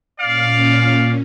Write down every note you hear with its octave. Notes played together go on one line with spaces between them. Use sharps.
A#2 C#4 D5 F5